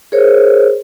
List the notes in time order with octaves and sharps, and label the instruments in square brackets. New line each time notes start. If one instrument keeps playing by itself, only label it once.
[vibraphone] G#4 A#4 C5 C#5